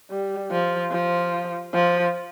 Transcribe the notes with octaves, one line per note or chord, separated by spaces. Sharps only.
G3
F3
F3
F3